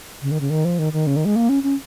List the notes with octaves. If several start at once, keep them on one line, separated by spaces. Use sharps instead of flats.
C#3
D#3
C#3
D#3
F3
D#3
D#3
C#3
D#3
G#3
A#3
C#4
C#4